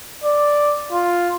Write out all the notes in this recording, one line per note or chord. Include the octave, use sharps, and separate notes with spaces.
D5
F4